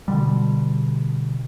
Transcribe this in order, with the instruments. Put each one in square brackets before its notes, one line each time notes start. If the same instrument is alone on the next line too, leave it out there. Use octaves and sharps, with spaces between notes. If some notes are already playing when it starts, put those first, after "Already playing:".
[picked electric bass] B2 D3 G3